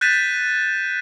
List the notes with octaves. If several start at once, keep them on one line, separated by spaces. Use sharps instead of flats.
F#6 G6 A6 B6 D#7 E7